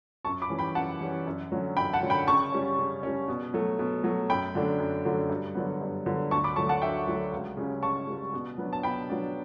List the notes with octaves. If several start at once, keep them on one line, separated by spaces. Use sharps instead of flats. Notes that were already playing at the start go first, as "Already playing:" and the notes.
F#2 A5 C#6
B5 D6
E3 G3 C#4
G5 B5
F#2 F#5 A5
E3 G3 C#4
F#2
D3 F#3 C#4
F#2 G5 B5
F#5 A5
D3 F#3 C#4
G5 B5
C#3 A5 C#6
G3 C#4
C#3
G3 C#4
B2
F#3 A3
B2
F#3 A3
F#2 G5 B5
D3 F#3 A3 D4
F#2
D3 F#3 A3 D4
G2
D3 F#3 B3
G2
D3 F#3 B3
D2 A5 C#6
B5 D6
D3 F#3 A3 A5 C#6
F#5 A5
D2 E5 G5
D3 F#3 A3
C#2
C#3 G3 C#4
C#2 A5 C#6
C#3 G3 C#4
B2
F#3 B3 D4
A5
B2 G5 B5
F#3 B3 D4